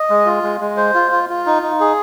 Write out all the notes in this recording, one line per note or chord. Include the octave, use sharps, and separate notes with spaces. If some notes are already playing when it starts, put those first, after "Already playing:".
Already playing: D#5
G#3
F4
G#3
G#3
C5
F4
F4
F4
D#4
D#4
G#4